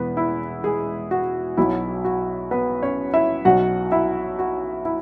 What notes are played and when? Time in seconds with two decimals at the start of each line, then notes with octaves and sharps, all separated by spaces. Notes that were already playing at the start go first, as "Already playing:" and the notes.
Already playing: E1 E2 E3 B3 B4
0.17 E4
0.64 G#3 G#4
1.11 F#4
1.57 B1 B2 F#3 E4
2.05 F#4
2.51 B3 B4
2.82 C#4 C#5
3.14 E4 E5
3.45 B1 B2 F#3 F#4 F#5
3.92 E4 E5
4.39 F#4
4.85 E4